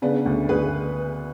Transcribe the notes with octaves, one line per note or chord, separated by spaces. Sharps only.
C#3 B3 D4
D2
D2 G#4 B4